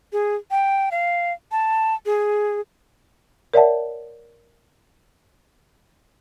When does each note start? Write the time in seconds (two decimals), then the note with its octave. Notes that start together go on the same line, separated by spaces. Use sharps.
0.13 G#4
0.51 G5
0.91 F5
1.52 A5
2.06 G#4
3.54 A#4 C#5 D5 E5 F#5 A5